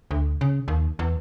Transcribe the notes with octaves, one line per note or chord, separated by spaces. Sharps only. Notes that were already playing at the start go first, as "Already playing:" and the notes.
D2
C#3
D#2
E2